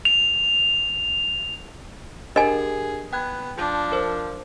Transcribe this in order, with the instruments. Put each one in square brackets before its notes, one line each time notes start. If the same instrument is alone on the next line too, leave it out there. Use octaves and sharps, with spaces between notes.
[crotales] F7
[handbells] D4 G4 A#4 [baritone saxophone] G#4 [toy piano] D#5 G#5
[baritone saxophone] B3 [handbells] G5 F#6 G#6
[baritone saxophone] F3 [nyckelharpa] D4
[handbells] A#4 C5